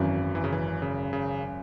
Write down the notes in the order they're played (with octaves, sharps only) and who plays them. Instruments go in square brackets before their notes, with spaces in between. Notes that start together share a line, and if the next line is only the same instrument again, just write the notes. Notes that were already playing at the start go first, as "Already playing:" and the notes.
Already playing: [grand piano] G#1 F#2 F#3 [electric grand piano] E3
[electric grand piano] E3
C#3
E3
C#3
C#3